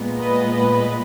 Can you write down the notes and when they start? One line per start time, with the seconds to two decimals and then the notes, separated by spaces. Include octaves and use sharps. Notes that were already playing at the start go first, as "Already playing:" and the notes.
Already playing: A#2 G#3 B3
0.17 B4 D#5
0.52 B4 D#5